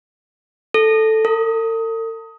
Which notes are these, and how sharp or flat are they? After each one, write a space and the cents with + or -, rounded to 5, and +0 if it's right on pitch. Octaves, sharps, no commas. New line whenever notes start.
A4 +0
A4 +45